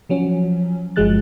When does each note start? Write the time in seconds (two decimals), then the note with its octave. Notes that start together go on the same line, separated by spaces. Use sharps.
0.09 F3 F#3 C#4
0.96 G1 F3 F#3 G#3 F#6 A6